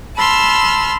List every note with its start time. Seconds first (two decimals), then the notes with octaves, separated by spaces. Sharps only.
0.16 A5 B5 C6 E6 F6